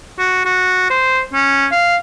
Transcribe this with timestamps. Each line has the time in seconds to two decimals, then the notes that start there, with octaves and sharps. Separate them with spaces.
0.19 F#4
0.45 F#4
0.91 C5
1.33 C#4
1.72 F5